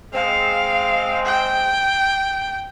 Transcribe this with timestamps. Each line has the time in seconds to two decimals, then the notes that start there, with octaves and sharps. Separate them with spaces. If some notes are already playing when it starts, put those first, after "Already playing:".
0.14 G#3 C4 F5
1.26 G5